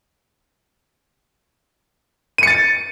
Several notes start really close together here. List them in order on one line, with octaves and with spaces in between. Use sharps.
D#7 C#7 A6